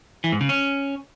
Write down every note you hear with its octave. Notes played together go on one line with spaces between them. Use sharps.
E3
G#2
C#3
C#4